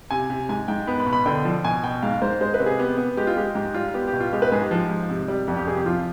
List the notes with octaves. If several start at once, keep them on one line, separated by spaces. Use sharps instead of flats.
C3 G#5
C3
G#2 G#5
G#2 G5
B3 B5
B5
B2
B5
D3 G5
F3
B2 G#5
B2 G5
G#2 F5
G#2 C5
G#3 C5
B4
C3
G#4
B3 G4
B3
G#3 G4
F4
G#3 G4
G#2 G4
G3 F4
B3 G4
G4
B2
F4
G#3 G4
B4
G#2 G#4
G4
F3
G#2
C3
G3
F2
G4
C3 G#4
G4
F3 F4